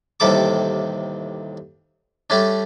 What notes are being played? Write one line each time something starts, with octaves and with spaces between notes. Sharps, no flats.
A1 D#2 C3 G3 A4 D6
G3 A3 C#4 D4